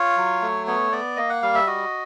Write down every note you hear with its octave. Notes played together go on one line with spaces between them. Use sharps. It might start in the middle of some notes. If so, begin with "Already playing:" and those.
Already playing: F4 C#5
F#3
A3
B3 C#5
B3 D5
A#3 D#5
F#5
G3 F5
E5
F#4 D#5